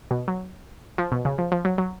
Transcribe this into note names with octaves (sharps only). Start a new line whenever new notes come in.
B2
F#3
F3
B2
C#3
F3
F3
F#3
F#3